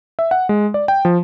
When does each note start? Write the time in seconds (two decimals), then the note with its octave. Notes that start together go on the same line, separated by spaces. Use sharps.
0.19 E5
0.31 F#5
0.49 G#3
0.74 D5
0.88 G5
1.05 F3